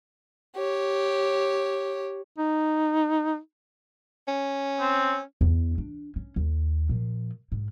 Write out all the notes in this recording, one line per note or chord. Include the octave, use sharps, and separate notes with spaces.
G4 C#5
D#4
C#4
C4
E2
D4
C#4
D#2
A#2 F3
G#2